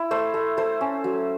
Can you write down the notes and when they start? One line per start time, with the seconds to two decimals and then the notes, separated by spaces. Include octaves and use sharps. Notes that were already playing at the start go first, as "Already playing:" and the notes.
Already playing: E4
0.11 A3 C5
0.34 A3
0.57 A3 C5
0.81 C#4
1.04 F#3